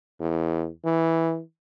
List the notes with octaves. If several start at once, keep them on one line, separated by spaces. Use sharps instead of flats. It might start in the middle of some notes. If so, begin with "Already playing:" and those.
E2
E3